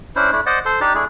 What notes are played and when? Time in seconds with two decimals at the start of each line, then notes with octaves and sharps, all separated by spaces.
0.16 C#4 D4 E4 C5
0.32 A3 D4 E4
0.46 C5 D5 D#5 F#5
0.65 A4 C5 C6
0.81 D4 D#4 G4 A5
0.95 A3 D4 E4 G#4